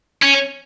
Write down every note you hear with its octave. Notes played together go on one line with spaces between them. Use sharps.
C#4